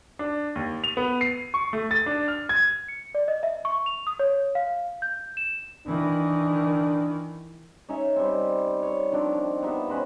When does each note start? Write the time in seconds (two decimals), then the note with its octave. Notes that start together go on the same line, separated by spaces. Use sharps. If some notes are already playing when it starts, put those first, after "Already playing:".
0.19 D4
0.55 D#2
0.84 F7
0.97 B3
1.21 C7
1.54 C#6
1.73 A3
1.91 A6
2.06 D4
2.28 F6
2.49 G#6
2.88 C#7
3.15 D5
3.28 D#5
3.43 E5
3.65 C#6
3.86 F7
4.07 D#6
4.19 C#5
4.55 F5
5.02 G6
5.37 E7
5.87 D#3 E3 D4
7.89 C#4 D#4 C#5 E5
8.16 G3 C4
8.83 C#5
9.12 D#3 F3 C4 D4
9.62 B3 D#4 G4 E5
9.89 C#4 B4 C5 D#5